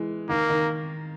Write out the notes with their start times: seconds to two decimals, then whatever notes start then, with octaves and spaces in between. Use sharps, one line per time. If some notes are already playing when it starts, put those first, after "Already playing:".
Already playing: E3 G#3
0.29 D#3 A#3
0.49 D#3